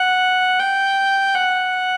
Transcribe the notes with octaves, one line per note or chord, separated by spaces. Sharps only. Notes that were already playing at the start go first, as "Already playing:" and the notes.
Already playing: F#5
G5
F#5